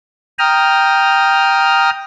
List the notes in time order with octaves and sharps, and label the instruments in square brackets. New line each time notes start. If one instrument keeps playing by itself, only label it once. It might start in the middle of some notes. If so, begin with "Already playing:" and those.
[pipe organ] G5 A#5 D#6 F6